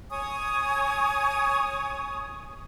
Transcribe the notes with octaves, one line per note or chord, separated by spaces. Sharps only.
C#5 G#5 C#6 D#6